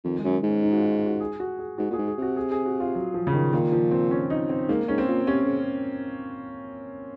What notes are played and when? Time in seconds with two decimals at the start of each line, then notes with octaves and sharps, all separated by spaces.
0.04 F2 D#3
0.19 G#3
0.24 F#2
0.43 G#2 C#4
0.62 D#4
0.72 F#4
0.77 F4
1.06 F#4
1.20 G#4
1.40 F#4
1.59 G#4
1.78 G#2 F#4
1.90 A#2
1.93 G#2 G#4
2.08 G#4
2.18 C3 F#4
2.36 G#4
2.51 G#4
2.66 F#4
2.80 F4
2.95 F#3
3.14 F3
3.27 C#3
3.33 D#3
3.53 A#2 D#3
3.72 F3
3.91 C4
4.11 C#4
4.30 D#4
4.49 C4
4.69 G#2 A#3
4.88 G#2 C#4
4.98 C4
5.08 A#2
5.27 C3 C#4
5.46 C#3